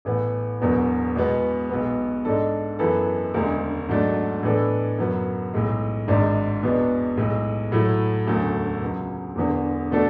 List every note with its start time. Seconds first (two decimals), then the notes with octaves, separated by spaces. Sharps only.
0.05 A1 A2 E3 B3
0.60 E1 E2 B2 F#3 B3
1.15 E2 B2 G#3 B3
1.70 B1 B2 G#3 B3
2.25 G#2 G#3 D4 A4
2.79 F#2 E3 B3 E4 A4
3.34 E1 D2 C#3 G#3
3.89 G#2 F#3 A3 D4
4.43 A2 E3 B3 D4 A4
4.99 F#2 C#3 F#3 B3
5.54 B1 A2 G#3
6.08 G#1 G#2 G#3 D4
6.63 E2 B2 G#3 B3 D4
7.17 B1 A2 G#3
7.72 A2 F#3 A3 E4
8.26 E1 D2 C#3 F#3 A3
8.82 C#2 C#3 F#3
9.36 E1 E2 D3
9.91 B2 A3 D4 F#4 A4